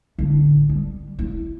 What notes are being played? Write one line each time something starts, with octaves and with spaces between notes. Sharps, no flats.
A1 D3
G3
E4